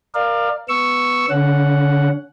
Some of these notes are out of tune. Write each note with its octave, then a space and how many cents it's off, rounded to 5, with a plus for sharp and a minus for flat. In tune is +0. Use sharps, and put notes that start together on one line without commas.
A#4 +0 D5 +30 F5 +0
B3 +0 C#6 +0 E6 +0
D3 -25 C#4 +20 F#5 +0